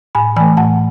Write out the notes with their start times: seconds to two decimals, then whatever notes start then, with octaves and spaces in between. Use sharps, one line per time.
0.15 A2 G#5 B5
0.36 E3 A3 G#5 B5
0.57 A2 F#5 A5